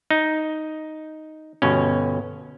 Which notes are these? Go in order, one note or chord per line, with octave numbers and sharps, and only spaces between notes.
D#4
G1 B2 C#4